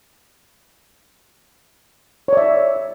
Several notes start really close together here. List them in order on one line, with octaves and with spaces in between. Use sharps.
C#5 D5 E5